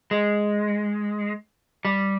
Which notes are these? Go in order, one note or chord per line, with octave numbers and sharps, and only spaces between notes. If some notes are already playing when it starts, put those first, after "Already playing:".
G#3
G3